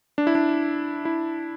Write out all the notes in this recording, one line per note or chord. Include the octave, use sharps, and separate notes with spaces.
D4
E4
D4
E4